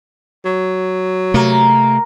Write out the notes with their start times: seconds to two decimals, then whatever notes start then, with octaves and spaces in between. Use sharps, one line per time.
0.45 F#3
1.34 C3 A3 A#3